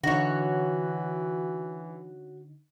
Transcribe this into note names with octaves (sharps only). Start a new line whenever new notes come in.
D3 E3 D#4 F#4 C#5